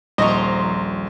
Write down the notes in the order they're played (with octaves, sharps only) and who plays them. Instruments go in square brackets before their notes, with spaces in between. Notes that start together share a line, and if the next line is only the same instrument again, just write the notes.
[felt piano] D#1 [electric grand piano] A#1 [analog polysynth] F3 A#5 C6 [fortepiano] D#5 C#6